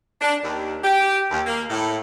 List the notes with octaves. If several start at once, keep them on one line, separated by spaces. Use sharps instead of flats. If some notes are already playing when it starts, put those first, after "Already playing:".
D4
D#2
G4
D#2
A#3
A2